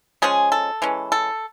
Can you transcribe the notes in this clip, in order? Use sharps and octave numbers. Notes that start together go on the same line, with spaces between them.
F3 G#3 C#4 G#4
A4
E3 G#3 C#4
A4